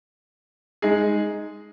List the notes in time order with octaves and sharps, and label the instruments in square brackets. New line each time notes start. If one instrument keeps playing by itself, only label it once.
[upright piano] G#3 D#4 G#4